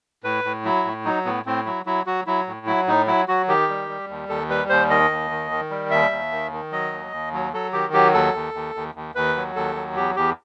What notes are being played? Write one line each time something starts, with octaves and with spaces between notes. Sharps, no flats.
A2 B4
A2
F#3 E4
A2
F#3 D#4
A2 B3
A2 C4
F#3 E4
F#3 E4
F#3 F#4
F#3 E4
A2
F#3 E4
A2 D#4
F#3 E4
F#3 F#4
D#3 G4
G3
G3
D#2
D#2 A4
G3 B4
D#2 C5
D#3 D#5
D#2
D#3
D#3
G3
D#2 E5
D#2
D#3
D#3
F#3 D#5
D#2
D#2
F#3
F#3 A4
D#3 G4
F#3 G4
D#2 A4
D#2
D#2
D#2
D#2
D#2 B4
F#3
D#2 A4
F#3
E2 G4
E2 G4